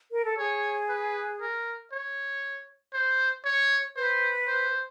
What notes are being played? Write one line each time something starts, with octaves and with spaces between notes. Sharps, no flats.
A#4
A4
G#4 C#5
B4
A#4
C#5
C5
C#5
B4 C5
C5